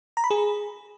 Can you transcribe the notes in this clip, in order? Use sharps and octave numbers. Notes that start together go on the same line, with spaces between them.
A#5
B5
G#4